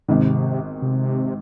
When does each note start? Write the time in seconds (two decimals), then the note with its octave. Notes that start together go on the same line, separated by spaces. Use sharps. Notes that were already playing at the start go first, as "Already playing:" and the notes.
0.08 G#1 G#2 C3 D#3
0.82 C3